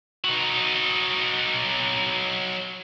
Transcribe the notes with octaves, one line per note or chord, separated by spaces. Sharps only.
F#3 D#4